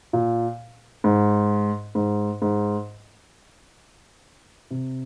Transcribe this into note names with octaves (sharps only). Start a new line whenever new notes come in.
A#2
G#2
G#2
G#2
C3